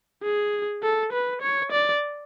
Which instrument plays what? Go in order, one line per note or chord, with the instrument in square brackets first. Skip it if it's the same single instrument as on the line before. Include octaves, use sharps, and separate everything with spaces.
[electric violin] G#4
A4
B4
C#5
D5